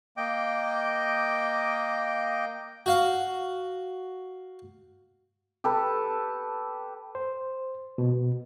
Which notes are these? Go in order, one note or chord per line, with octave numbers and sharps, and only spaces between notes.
A#3 D#5 G5 D6
F#4 F5
G4 A4 B4
C5
B2